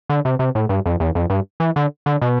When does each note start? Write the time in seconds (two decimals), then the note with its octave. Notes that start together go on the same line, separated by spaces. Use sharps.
0.09 D3
0.25 C3
0.39 C3
0.55 A2
0.69 G2
0.86 F2
1.00 E2
1.15 F2
1.30 G2
1.60 E3
1.76 D3
2.06 D3
2.22 B2